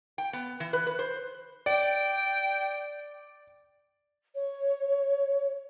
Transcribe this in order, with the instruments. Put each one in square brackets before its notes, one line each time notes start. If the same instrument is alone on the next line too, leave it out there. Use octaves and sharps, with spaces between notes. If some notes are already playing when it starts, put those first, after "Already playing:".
[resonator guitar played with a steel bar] G5
B3
E3
B4
B4
C5
[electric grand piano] D5 [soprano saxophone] G5
[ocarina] C#5